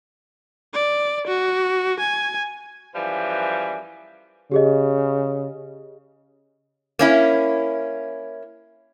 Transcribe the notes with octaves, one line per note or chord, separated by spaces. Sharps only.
D5
F#4
G#5
F#2 E3 F3 G3 B4 G#5
C#3 G4 G#4 D#5
A#3 C#4 E4